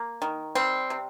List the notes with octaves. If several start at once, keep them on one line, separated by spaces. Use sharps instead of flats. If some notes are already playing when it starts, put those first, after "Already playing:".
Already playing: A#3
D#3
G3 C4
C3